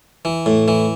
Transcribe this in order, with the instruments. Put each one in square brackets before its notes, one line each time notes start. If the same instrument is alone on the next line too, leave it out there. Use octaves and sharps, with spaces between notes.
[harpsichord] E3
A2
E3